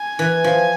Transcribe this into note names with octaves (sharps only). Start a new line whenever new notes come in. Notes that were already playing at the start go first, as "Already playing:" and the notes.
Already playing: G#5
E3
F3